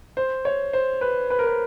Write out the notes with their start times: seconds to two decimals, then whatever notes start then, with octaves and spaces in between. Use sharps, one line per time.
0.17 C5
0.45 C#5
0.73 C5
1.01 B4
1.30 B4
1.39 A#4
1.47 B4